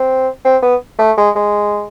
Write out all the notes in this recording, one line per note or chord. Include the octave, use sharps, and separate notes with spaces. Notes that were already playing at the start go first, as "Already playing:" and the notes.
Already playing: C4
C4
B3
A3
G#3
G#3